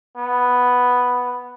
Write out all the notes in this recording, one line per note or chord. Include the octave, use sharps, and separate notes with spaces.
B3